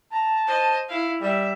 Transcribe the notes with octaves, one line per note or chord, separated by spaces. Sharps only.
A5 A#5
C5 D#5
E4 F5
G3 E5